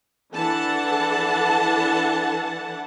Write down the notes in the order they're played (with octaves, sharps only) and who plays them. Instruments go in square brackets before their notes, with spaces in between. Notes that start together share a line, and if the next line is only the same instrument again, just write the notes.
[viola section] E3 D4 A4 F#5 A5